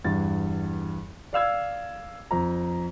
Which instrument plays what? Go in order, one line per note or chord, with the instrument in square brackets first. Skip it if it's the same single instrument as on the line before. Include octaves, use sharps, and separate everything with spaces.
[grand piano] E2 G2 A6
D5 F5 E6 G#6
F2 A#5